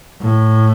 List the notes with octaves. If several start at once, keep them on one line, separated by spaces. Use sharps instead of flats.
A2